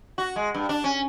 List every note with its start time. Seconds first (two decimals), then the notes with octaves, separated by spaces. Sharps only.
0.18 F#4
0.36 G#3
0.54 G2
0.69 D4
0.84 C#4